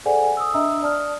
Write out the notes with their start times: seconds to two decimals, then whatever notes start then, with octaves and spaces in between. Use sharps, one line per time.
0.05 G#4 A4 C5 D5 F#5 G#5
0.37 D#6 E6
0.54 D4 D#5 E5 A#5 D#6 E6
0.83 D5 A5 D#6 F6